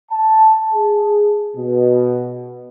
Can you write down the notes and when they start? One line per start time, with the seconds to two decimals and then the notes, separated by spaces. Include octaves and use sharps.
0.11 A5
0.73 G#4
1.56 B2